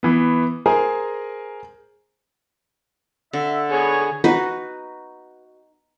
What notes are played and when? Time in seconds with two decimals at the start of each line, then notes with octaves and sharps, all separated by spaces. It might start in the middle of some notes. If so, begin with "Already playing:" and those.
0.03 E3 B3
0.66 G#4 A#4 C5 G#5 A#5
3.33 D3 E5
3.71 B3 G#4 C#5
4.24 D#4 F#4 B4 D#5